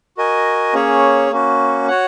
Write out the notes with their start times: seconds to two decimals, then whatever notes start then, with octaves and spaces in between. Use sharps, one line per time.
0.17 F#4 A#4 D#5 G#5
0.73 A#3 C#4 G#4 C#5
1.31 A#3 C#4 F#4
1.88 F#4 C#5 F#5